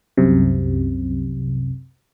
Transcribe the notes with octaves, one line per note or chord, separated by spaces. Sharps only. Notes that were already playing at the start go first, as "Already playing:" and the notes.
C2 F#2 C3